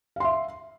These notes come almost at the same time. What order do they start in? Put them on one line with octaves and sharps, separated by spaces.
F5 C6 E5